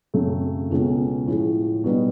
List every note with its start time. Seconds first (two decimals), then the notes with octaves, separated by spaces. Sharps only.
0.14 F#2 C#3 F#3 A3 C4
0.70 C#2 B2 G#3 C#4
1.27 A2 F3 G#3
1.84 B2 G3 B3 D#4